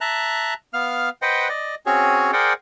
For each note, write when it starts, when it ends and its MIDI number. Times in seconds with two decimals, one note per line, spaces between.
0.01 0.54 76
0.01 0.54 81
0.01 0.54 82
0.01 0.54 90
0.74 1.09 59
0.74 1.09 77
0.74 1.09 89
1.22 1.48 71
1.22 1.48 72
1.22 1.48 75
1.22 1.48 78
1.22 1.48 79
1.49 1.75 74
1.49 1.75 75
1.86 2.31 60
1.86 2.31 61
1.86 2.31 66
1.86 2.31 68
1.86 2.31 73
2.33 2.53 68
2.33 2.53 70
2.33 2.53 72
2.33 2.53 74
2.33 2.53 78
2.33 2.53 79